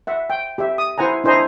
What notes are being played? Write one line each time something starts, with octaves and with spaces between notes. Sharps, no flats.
E5 F#5
G5
G4 E5
D#6
E4 C5 F#5 G#5 A#5
D4 E4 C5 D#5 G#5 A#5